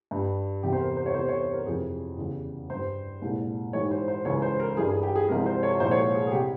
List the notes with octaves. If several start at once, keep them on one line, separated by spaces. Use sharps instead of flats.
G2 G3
E2 C3 E3 G4
C5
A#4
C5
C#5
E2 C3 G3 C5
C#5
C5
A#4
F2 C3 E3 G#4
E2 C#3 G3
G2 G3 C5
C2 A#2 G#3
G#2 E3 G3 C#5
C5
C5
C#2 C#3 E3 C#5
C5
A#4
G2 E3 G3 G#4
G#4
G4
G#4
C2 C3 F3 G#3 A#4
C5
C#5
C2 A#2 F3 G#3 C5
C#5
C5
G#4
G#4
C3 G3 G4